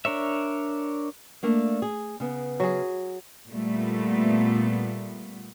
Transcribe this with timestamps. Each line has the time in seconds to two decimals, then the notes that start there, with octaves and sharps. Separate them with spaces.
0.05 D4 A#4 C#5 E5
1.43 A3 A#3 D4
1.82 G#4
2.20 C#3 B3
2.60 F#3 G#4
3.49 A#2 G3 A3 B3